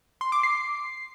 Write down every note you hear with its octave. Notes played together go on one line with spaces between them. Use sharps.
C6
D6
C7